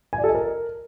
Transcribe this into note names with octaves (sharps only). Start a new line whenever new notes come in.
G#5
D5
A4
D#5
A#4